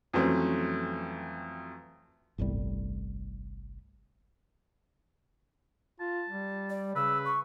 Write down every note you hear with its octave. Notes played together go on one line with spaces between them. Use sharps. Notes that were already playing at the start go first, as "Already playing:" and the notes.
F2 E3 F#3 A3 C4 C#4
G1 C2 A2 G3
F4 A5
G3
D5
C#3 B4 E6
C#6